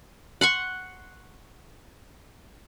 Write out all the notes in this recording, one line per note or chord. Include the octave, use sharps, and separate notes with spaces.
F#5 C6 C#6